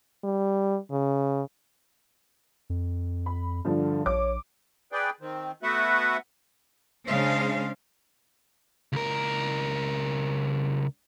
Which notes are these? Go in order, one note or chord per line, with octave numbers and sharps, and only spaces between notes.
G3
C#3
F2
B5
G2 D3 F3
A#1 C#5 D6
G#4 B4 D5 G5
D#3 C4
A3 B3 F#4 B4 E5 F#5
C#3 G#3 D4 C5 F5
C#2 A#4